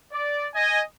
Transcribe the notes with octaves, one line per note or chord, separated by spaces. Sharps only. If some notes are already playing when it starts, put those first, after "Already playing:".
D5
D#5 G#5